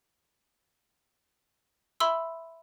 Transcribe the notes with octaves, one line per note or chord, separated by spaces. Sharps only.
E5 B5 C6 E6